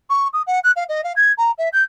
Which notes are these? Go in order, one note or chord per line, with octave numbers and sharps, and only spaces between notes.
C#6
D#6
F#5
F#6
F5
D#5
F5
G#6
A#5
E5
G6